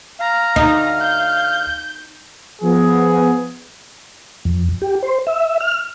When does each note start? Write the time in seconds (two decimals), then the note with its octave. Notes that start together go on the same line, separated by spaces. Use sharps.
0.20 F5 A#5
0.56 D2 D#4
1.00 G6
2.62 F3 B3 G#4
4.45 F2
4.82 G4
5.03 C5
5.27 E5
5.61 F6